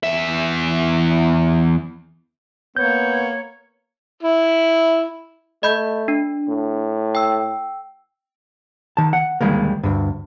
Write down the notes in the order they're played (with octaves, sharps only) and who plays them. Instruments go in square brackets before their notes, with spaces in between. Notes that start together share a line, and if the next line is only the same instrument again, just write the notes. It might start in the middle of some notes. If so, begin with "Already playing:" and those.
[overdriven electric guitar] E2 E5
[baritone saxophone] A#3 [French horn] B3 [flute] C#5 [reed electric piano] G6
[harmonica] E4
[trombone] A3 [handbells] D#5 B5 G6
[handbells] D4
[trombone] A2
[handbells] G5 E6
[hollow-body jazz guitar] D#3 A5
F#5
D2 D#3 G3 G#3 A#3
D2 G2